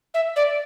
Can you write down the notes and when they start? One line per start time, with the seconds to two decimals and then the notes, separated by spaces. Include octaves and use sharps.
0.14 E5
0.36 D5